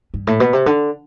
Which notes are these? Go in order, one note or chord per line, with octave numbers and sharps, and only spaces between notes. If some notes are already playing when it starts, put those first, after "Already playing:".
G2
A2
B2
C3
D3